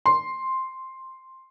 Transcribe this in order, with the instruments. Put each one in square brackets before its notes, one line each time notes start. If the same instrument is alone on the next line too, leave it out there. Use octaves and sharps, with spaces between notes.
[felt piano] C6